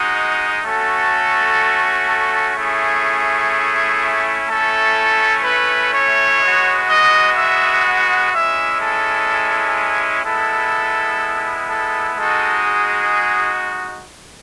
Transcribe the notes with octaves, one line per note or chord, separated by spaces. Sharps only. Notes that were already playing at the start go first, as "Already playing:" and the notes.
Already playing: G#3 D#4 F#4
A3 C#4 F#4 A4
A4
A3 C#4 E4 G#4
A3 C#4 E4 A4
B4
C#5
G#3 B3 F#4
D#5
E5
F#5
G#3 C#4 E4 E5
A4
G#3 B3 E4 A4
A4
G#3 D#4 F#4 A4
G#4